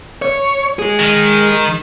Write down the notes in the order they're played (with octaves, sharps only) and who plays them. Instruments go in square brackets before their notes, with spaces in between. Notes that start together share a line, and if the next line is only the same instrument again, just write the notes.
[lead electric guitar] C#5
G#3 G#4
[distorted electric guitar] D#3